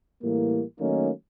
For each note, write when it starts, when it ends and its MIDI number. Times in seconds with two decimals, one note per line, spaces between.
0.23 0.63 45
0.23 0.63 52
0.23 0.63 55
0.23 0.63 58
0.79 1.10 51
0.79 1.10 54
0.79 1.10 57
0.79 1.10 58
0.79 1.10 61
0.79 1.10 63